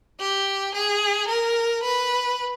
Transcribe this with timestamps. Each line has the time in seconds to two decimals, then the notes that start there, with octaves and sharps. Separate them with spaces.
0.20 G4
0.75 G#4
1.29 A#4
1.84 B4